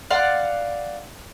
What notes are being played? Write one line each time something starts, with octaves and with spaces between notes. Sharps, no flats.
D5 F5 F#5 C6